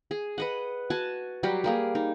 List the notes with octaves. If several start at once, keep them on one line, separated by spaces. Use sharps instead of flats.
G#4
B4 D#5 F#5
F#4 G#5 A5
F#3 G3 G4 A#5
G3 A#3 G#4
D#4